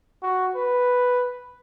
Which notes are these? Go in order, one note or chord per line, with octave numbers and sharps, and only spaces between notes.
F#4
B4